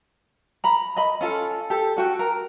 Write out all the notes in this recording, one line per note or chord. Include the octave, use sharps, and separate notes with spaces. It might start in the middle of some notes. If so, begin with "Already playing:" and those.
A#5 B5
D#5 B5
C#4 F4 A4
G4 A4
C#4 F#4 G5
A#4